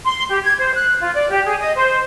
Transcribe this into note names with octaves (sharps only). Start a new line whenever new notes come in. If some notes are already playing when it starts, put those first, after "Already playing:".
C6
G4
G#6
C5
F#6
F4
D5
G4
G#4
D#5
C5